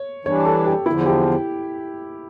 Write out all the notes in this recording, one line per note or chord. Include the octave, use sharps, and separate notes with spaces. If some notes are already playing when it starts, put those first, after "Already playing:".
Already playing: C#5
E3 G3 D4 C#5
A4
G4
E2 D3 F3 E4
G4